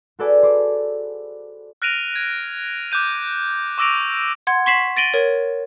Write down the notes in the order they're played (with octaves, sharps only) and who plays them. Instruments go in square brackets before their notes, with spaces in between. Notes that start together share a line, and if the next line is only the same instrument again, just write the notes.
[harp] F#4 G#4 A4 B4 D5 G#5
C5 D6
[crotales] F6 F#6 A#6 D7 D#7 F7
G#6
D6 F#6 G6 D#7
C#6 D6 E6 A#6 D7 F7
[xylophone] F#5 C6 G#6
C6 C#6 B6 C7 E7 F#7
A6 A#6 D7 D#7 F#7 G7
A#4 C#5